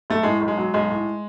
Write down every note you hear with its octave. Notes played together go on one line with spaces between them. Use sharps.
B1 A3
A2 G#3
B1
G#3
F#3
B1 G#3
A2